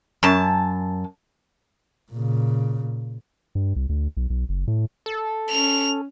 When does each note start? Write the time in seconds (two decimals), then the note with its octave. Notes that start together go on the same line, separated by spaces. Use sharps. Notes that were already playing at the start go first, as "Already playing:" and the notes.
0.23 F#2 A5
2.12 A#2 C#3
3.55 G2
3.76 C2
3.89 D2
4.17 B1
4.30 B1
4.49 F#1
4.67 A2
5.06 A4
5.49 C#4 F7